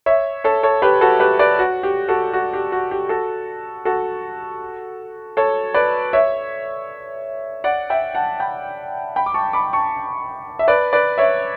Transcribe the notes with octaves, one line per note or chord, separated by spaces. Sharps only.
C#5 E5
A4 C#5
A4 C#5
G4 B4
F#4 A4
G4 B4
B4 D5
F#4
G4
F#4 A4
F#4
G4
F#4
G4
F#4 A4
F#4 A4
A4 C#5
B4 D5
C#5 E5
D5 F#5
E5 G5
F#5 A5
G5 B5
G5 B5
D6
A5 C#6
B5 D6
A5 C#6
E5
B4 D5
B4 D5
C#5 E5